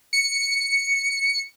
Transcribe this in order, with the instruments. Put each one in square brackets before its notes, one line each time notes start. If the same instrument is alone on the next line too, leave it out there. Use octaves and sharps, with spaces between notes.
[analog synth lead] C#7